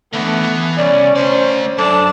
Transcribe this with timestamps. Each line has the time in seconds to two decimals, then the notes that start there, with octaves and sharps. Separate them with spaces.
0.13 D3 E3 A3 B3
0.43 E3
0.78 C2 C#4 D5
1.16 A3 C5 D5
1.78 F#2 D4 A4 A5